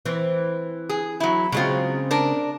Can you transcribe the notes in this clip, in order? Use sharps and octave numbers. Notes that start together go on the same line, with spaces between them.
E3 C4
G#4
F#3 E4
C#3 F#3 G#3 C4 F4
D4 A#4